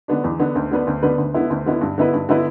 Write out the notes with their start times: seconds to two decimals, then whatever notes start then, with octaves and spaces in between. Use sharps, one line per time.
0.08 D3 B3 D4
0.24 E2
0.40 D3 B3 D4
0.56 D2
0.71 D3 B3 D4 B4
0.87 D2
1.03 D3 B3 D4 B4
1.18 D2
1.34 D3 B3 E4
1.50 D2
1.66 D3 B3 E4
1.81 G2
1.98 D3 B3 E4 B4
2.14 G2
2.29 D3 B3 E4 B4